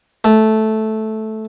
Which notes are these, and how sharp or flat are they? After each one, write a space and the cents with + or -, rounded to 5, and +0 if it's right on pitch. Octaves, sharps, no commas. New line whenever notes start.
A3 -10